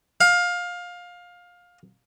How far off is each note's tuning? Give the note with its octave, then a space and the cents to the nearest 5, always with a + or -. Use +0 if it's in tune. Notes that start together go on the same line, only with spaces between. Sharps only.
F5 +20